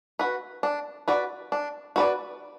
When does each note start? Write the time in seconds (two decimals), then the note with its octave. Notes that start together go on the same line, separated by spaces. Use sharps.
0.19 F#4 B4
0.63 D4
1.08 F#4 B4 D5
1.52 D4
1.96 F#4 B4 D5